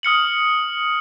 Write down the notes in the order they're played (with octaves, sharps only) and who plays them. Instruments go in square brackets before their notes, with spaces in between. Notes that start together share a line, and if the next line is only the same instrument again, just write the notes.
[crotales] D#6 F6 C#7 F#7